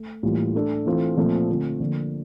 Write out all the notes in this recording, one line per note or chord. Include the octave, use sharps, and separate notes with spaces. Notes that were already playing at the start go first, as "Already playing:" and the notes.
Already playing: A3
A2 E3 G3 A#3 F4
A3 D4 A4
E3 A3 C4 F4
A#2 F3 A3 C4
D3 A3 C4 F4
D3 F3 A#3